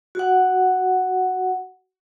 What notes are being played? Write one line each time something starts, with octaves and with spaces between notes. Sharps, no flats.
F#4 F#5